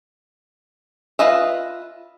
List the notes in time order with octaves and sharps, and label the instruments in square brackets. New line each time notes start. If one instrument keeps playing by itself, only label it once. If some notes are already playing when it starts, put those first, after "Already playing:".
[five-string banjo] F4 B4 D#5 E5